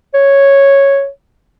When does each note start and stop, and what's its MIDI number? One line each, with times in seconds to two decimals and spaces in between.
0.14 1.08 73